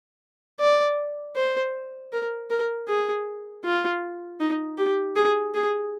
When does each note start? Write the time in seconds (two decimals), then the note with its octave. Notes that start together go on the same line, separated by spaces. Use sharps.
0.60 D5
1.36 C5
2.12 A#4
2.50 A#4
2.88 G#4
3.64 F4
4.40 D#4
4.78 G4
5.16 G#4
5.54 G#4